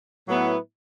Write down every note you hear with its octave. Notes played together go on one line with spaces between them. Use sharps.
A2 F#3 B3 E4